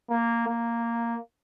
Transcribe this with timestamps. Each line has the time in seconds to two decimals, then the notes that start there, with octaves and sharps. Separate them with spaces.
0.10 A#3
0.48 A#3